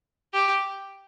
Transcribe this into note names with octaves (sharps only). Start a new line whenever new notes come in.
G4